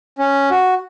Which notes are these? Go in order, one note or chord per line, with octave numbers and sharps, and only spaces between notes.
C#4
F#4